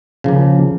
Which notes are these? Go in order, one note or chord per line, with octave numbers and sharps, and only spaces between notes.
C#3 F3 A#3